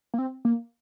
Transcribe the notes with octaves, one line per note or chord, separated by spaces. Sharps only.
A#3
C4
A#3